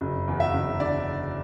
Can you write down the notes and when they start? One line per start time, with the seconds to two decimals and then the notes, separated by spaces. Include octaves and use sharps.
0.01 F#1
0.28 E2
0.40 E5
0.54 F#1
0.80 D3 D5